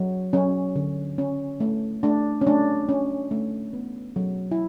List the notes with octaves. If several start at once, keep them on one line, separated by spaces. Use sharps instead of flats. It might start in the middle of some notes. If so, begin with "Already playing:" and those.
Already playing: F#3
F#3 C#4
D3
C#4
A3
A3 D4
C#4
A3 D4
C#4
A3
B3
F#3
E4